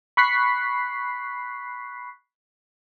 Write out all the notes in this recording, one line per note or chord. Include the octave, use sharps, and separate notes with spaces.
B5 C#6 F#6 B6 C7